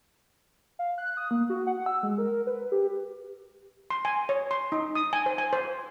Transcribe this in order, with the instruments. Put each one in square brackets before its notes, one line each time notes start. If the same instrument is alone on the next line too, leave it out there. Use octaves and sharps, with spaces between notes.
[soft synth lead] F5
F#6
D#6
A#3
F#4
F#5
E6
G#3
A#4
B4
G4
[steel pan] C6
G#5
C#5
C6
D#4
D#6
G#5
C5
G#5
C5